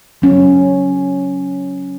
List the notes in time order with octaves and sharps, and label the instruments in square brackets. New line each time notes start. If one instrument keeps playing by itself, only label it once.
[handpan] F#3 C#4